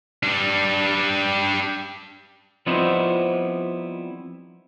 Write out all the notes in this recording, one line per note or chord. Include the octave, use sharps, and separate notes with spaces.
G3 D4
F3 G3 B3 C4 D#4 E4